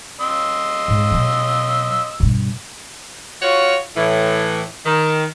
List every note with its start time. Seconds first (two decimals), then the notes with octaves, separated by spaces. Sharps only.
0.21 D#5 C6 E6
0.88 G#2
1.11 B2 F#3
2.20 G2 B2
3.42 F4 F#4 C#5
3.97 A2 E3
4.86 D#3